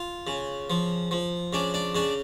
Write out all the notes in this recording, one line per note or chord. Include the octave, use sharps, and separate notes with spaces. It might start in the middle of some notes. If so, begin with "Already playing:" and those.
Already playing: F4
C#3
F3
F3
C#3 D4
D4
C#3 D4